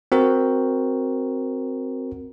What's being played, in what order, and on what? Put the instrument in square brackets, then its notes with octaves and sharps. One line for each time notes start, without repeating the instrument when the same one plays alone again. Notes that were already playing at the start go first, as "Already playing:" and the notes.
[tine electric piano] C4 F#4 A#4